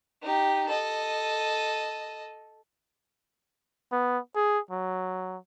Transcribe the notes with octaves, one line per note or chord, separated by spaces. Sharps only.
D#4 G4
A4 D#5
B3
G#4
F#3